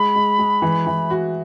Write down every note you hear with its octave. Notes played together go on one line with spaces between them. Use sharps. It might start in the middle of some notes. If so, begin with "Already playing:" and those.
Already playing: G#3 B5
G#3
G#3
E3
E3
F#4